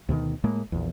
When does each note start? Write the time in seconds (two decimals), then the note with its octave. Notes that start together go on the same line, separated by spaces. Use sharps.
0.09 D2 B2 D3 D#3
0.44 A2 G#3 A#3
0.72 A#1 E2